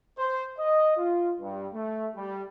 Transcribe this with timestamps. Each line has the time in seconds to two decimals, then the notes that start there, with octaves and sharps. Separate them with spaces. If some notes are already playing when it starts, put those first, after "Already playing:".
0.18 C5
0.58 D#5
0.97 F4
1.40 G2
1.74 A3
2.16 G3